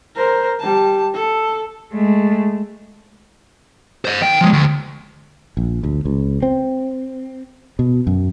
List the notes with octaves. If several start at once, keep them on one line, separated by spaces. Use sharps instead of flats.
A#4 C5
G3 A5
A4
G#3 A3
C5 D#5
D#3 G5
F3 G#3
D2
A#1
D2
C#2
C4
B2
F#2